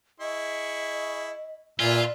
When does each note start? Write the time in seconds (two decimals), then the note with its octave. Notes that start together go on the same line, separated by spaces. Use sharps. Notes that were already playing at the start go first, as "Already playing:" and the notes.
0.20 E4 G#4 D#5 C#6
1.80 A#2 F4 B4 D5 E5 G#5